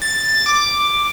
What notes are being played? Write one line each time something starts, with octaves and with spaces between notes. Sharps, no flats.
A6
D6